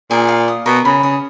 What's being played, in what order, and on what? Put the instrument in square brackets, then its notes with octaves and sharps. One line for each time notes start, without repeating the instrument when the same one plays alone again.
[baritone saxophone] A#2 [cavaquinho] G#4
[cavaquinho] F5
D#6
[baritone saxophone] B2 [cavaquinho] A#4
[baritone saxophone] C#3 [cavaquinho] B5
[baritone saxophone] C#3 [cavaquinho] D#6